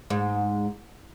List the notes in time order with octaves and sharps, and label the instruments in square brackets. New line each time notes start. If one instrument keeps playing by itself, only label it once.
[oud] G#2